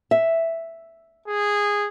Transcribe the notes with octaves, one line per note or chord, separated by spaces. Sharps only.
E5
G#4